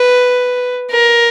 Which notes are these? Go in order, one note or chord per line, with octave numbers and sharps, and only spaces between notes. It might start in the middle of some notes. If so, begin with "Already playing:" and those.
Already playing: B4
A#4